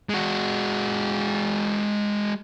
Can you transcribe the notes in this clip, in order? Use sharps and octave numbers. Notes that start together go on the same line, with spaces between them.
G#3 F#4